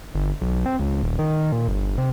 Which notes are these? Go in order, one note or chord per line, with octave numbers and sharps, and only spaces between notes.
G1
B1
C4
C#2
D#1
D#3
A#2
G1
C3